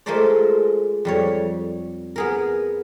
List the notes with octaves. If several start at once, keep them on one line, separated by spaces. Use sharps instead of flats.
G#3 A3 F4 A#4 C5 D5
F2 G3 C#5
B3 G#4 A#4